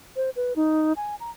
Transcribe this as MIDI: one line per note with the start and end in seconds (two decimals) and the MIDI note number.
0.16 0.30 72
0.36 0.53 71
0.56 0.93 63
0.96 1.15 80
1.20 1.30 82